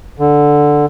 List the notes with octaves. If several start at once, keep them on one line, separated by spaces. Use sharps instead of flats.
D3